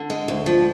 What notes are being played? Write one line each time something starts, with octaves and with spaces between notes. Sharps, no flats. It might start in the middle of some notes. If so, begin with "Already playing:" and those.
Already playing: D3
G#3
D2
F3